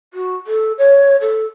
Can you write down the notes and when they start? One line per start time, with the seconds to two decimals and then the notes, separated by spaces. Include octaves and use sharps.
0.13 F#4
0.46 A4
0.78 C#5
1.21 A4